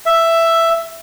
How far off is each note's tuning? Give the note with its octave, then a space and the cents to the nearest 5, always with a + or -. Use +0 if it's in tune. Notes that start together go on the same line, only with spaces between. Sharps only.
E5 +5